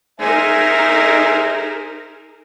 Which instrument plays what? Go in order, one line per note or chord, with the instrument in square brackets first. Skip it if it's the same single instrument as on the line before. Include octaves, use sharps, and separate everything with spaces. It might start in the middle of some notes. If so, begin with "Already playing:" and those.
[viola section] D#4 G#4 A#4 [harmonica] C5 E5 G#5